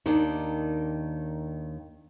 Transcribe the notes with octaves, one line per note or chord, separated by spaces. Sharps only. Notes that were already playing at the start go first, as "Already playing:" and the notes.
D#2 D#3 D4